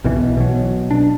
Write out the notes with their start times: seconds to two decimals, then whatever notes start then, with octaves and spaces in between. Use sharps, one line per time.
0.04 B1 B2 E3
0.37 B2 F#3
0.91 D4